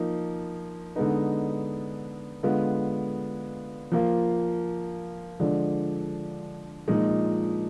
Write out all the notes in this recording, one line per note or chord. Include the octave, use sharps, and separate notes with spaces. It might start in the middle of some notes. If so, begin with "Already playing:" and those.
Already playing: F3 A#3 D#4
D3 G#3 B3 D#4
D3 G#3 B3 F4
F3 A#3 F4
D3 F3 G#3 D4
A#2 F3 G#3 D#4